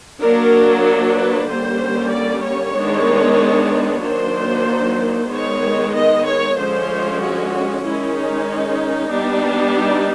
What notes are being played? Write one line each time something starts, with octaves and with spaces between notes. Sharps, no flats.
F#3 A#3 D4 A#4
A#4
B4
D3 G3 A#3 C#4 C5
D5
C#5
D#3 G#3 B3 D4
D#3 F#3 A#3 D4 C5
D#3 G#3 B3 C#5
D#5
C#5
D3 F3 G#3 C#4 C5
F#4
D#3 G#3 C#4 E4
D#4
G3 B3 D4
D#4